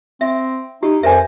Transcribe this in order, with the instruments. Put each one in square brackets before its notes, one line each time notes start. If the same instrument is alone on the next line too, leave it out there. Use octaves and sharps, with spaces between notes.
[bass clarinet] C4 [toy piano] E5
[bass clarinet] D#4 [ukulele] E4 [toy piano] G4
[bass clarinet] F2 [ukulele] A#4 C5 G#5 [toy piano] E5